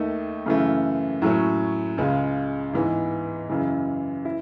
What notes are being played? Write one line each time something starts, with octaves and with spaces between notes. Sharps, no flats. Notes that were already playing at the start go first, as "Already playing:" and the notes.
Already playing: D#2 D#3 A3 D#4
F#2 C#3 E3 A3
A2 F#3 A3 C#4
C#2 C#3 G#3
G#2 E3 B3
F#2 C#3 E3
E4